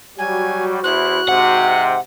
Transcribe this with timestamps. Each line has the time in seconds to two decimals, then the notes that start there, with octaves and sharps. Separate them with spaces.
0.18 F#3 G3 F#4 G#5
0.84 E2 E4 C5 F#6
1.29 G#2 C3 F#5